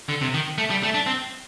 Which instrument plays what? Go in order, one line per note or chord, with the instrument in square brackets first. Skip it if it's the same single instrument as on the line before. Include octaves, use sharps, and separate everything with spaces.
[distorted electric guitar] D3
C3
D#3
A3
G3
A3
D4
C4